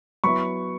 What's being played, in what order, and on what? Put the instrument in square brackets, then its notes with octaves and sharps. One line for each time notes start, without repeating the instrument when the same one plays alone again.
[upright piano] F#3 B3 E4 B5 C#6